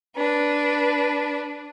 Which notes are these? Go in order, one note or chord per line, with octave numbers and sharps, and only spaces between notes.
D4 B4